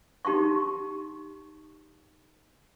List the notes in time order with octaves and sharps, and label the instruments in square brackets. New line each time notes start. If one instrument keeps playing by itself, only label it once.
[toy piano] D#4 G4 A5 C6 C#6